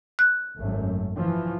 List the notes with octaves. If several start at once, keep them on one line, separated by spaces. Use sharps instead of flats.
F#6
G#1 F#2 A3
E3 F3